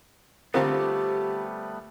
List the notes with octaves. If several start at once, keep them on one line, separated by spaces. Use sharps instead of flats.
D3 G3 A3 B3 C4 F4 G4 A#4